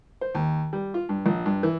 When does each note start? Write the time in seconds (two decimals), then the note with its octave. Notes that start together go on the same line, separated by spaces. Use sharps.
0.21 C5
0.35 D#2
0.73 G3
0.94 F4
1.09 G2
1.26 A#1
1.46 G2
1.63 E3